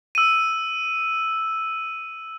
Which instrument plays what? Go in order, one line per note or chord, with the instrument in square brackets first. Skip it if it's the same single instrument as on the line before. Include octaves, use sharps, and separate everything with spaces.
[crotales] E6 D#7